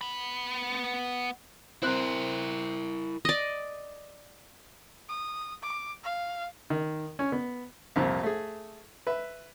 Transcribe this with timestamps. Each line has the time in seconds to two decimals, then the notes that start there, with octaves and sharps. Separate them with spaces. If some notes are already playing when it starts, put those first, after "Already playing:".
0.01 B3 B5
1.82 C4 E4 A#4 F#6
3.25 D5 D#5
5.09 D#6
5.63 D6
6.04 F5
6.70 D#3
7.19 C#4
7.32 B3
7.96 C2 F2 A#2
8.23 A3 G#4
9.07 B4 E5